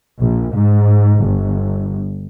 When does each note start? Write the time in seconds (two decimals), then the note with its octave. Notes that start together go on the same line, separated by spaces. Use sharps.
0.21 A#1
0.55 G#2
1.23 G1